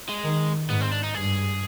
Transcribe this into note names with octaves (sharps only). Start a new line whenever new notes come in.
G#3
D#3
G#2 B3
C4
D4
D#4
G2 G#4